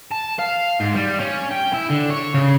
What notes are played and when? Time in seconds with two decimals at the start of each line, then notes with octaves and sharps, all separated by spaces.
0.11 A5
0.39 F5
0.80 G#2
0.95 G3
1.20 C#4
1.51 G5
1.74 E4
1.90 D3
2.10 C#5
2.34 C#3